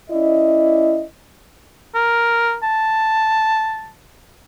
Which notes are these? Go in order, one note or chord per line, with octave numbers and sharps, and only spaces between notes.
C#4 E4 D5 D#5
A#4
A5